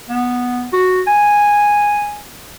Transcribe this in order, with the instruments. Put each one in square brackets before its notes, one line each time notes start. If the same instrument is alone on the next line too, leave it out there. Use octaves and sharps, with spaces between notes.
[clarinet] B3
F#4
G#5